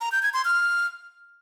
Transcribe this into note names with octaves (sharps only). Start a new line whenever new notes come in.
A#5
G6
G#6
C6
F6